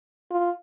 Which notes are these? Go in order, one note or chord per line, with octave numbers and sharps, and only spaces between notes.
F4